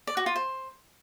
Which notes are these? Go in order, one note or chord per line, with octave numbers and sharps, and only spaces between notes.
D5
F#4
F4
C5